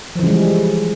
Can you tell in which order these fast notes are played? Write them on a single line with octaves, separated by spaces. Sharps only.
F3 E3 C#3 G#3 G3